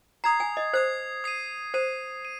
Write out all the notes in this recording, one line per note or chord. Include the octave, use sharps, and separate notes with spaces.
A#5 D#6 G#6 C7
G#5
D#5
C5 D#6 G#6 C7
D#6 C7 D#7
C5 D#6 C7 D#7
D#7